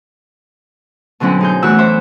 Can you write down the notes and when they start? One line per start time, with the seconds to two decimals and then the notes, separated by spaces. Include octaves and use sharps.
1.20 B2 D3 F#3 C4 C#4 E4
1.41 D#4 G#4 G6
1.62 E2 E3 A3 F#4 E6 F#6
1.78 C5 C#5 E5